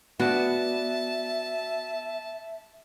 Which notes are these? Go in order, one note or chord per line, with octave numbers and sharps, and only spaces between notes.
B3 F#4 D5 E5 A5